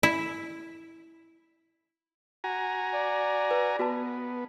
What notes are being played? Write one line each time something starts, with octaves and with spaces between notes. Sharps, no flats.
E4
F#4 G#5 A#5
D5
B4
B3 F#4 B4 A5